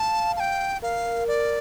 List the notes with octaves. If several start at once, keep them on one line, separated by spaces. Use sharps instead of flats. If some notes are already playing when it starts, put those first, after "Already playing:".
Already playing: F5 A5
A5
G5
A#4 F5
D5